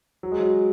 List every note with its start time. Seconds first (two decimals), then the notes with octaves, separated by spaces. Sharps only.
0.23 F#3
0.32 G#3
0.40 F#3